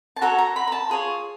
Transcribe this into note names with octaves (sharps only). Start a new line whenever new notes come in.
A5
F#4 A4 C#5 A#5
A#5
B5
A#5
A5
F4 G#4 C#5